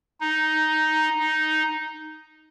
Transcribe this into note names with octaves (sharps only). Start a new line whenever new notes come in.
D#4
D#4